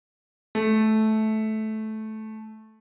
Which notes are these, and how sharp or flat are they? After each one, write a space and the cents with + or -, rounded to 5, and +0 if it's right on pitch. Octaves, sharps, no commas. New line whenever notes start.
A3 -15